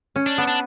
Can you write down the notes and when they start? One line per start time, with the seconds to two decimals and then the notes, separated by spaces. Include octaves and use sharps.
0.16 C#4
0.26 D4
0.38 B3
0.47 D4